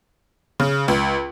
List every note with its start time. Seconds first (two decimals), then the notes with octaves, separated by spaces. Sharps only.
0.60 C#3
0.88 C#2